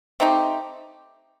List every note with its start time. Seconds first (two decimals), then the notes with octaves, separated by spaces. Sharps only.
0.20 A3 C4 D#4 G4